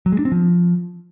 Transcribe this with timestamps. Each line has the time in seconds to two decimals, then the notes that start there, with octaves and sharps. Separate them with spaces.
0.06 F#3
0.12 G#3
0.19 D4
0.25 C4
0.32 F3